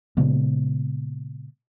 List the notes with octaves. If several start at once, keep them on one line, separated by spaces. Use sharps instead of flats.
A#2 C#3 G#3 B3